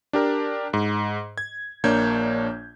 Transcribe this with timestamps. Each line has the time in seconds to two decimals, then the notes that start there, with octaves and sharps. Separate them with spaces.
0.13 D4 G4 A#4
0.73 G#2
1.38 G#6
1.84 A#1 A#3 D4 C#5 G6 G#6